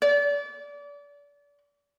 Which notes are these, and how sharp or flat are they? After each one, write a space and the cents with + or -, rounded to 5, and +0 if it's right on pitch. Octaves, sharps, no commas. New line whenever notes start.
D5 -30